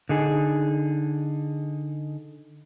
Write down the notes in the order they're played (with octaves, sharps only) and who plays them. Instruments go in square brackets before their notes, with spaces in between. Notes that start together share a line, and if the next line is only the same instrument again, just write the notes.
[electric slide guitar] D3 D#4 G#4